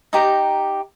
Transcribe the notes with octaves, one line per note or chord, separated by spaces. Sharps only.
D#4 G4 A#5